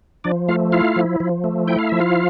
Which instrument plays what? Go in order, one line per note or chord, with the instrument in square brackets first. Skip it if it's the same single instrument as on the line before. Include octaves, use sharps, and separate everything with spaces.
[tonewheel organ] F3 D4 D5
A3 F4 F5
E4 F4 F5
F3
F3
A3
E4 G5
F5
F3 E5
F4 F5